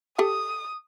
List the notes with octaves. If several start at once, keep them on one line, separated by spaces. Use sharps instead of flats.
G4 A4 A5 D#6